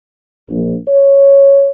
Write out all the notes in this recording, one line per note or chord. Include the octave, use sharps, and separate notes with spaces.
A#1
C#5